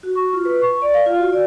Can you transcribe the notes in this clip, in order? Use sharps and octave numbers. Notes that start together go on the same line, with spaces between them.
F#4
C#6
F4
B4
C#6
D5
F5
F4
F#4
D5